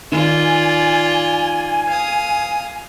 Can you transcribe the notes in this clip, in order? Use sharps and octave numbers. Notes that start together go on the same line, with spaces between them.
D#3 F4 D5 G#5
F5 D#6